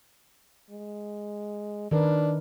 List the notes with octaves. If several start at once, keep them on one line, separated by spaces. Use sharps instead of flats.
G#3
D#3 D4 A#4 B4